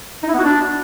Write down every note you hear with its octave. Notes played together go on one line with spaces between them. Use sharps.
D#4
E4
B3
F#4
D4